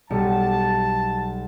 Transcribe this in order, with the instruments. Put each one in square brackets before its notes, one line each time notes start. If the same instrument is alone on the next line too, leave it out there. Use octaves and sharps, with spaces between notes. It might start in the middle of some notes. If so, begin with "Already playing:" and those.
[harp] B1 G3 C#7 [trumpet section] A5